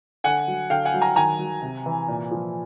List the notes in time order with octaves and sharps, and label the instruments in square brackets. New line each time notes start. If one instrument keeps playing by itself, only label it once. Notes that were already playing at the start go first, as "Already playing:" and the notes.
[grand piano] D3 F#5 G#5
F#3
D3 F5 G5
F#5 G#5
F#3
G#5 A#5
D#3 G#5 A#5
F#3
C3
E3
A#2
F3